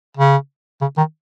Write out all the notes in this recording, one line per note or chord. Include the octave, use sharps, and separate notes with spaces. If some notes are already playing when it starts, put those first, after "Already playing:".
C#3
C#3
D#3